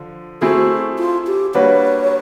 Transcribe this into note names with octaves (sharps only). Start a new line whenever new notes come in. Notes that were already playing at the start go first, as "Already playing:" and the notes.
Already playing: D3 F3
A3 C4 E4 F#4 G#4
F4
G4
G3 A#3 D4 F#4 B4 C#5